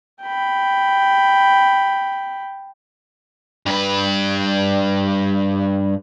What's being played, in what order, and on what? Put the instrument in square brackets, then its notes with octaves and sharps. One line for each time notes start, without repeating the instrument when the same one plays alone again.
[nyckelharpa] G5 B5
[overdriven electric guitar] G2 B4